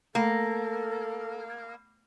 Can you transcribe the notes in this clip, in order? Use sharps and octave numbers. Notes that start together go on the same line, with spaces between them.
A3 A#3 A4